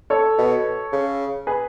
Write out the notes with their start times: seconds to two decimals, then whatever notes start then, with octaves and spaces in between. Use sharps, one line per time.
0.10 A4 C#5
0.38 B2
0.93 C#3
1.47 G#4 B4